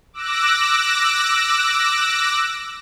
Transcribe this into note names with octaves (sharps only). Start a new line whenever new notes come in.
D6 E6 F#6 A#6